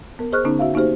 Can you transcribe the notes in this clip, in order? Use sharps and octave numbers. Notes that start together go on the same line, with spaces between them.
B3 A#4
G#4 C5 D#5 C#6 F6 F#6
D3 B3 C#4 D#4
F#4 E5 F5
A#3 D#4 F#4 G4 C5